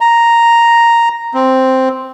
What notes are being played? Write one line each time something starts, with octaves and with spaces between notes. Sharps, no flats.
A#5
C4